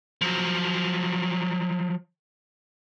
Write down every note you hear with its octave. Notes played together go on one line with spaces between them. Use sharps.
F3 F#3